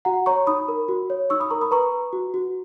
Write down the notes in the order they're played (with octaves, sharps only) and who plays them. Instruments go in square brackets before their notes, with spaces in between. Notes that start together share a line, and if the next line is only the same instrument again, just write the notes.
[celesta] F#4 F#5 A#5
C#5 A#5 C#6
D#4 B5 D#6
A#4
F#4
C#5
D#4 C#6 E6
B5 D#6
A#4 A#5 C#6
B5 D#6
B4 A#5 C#6
B4
F#4
F#4